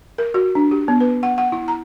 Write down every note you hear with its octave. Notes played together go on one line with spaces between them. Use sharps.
A#4
F#4
D4
G4
B3
B4
F#5
F#5
E4
A#5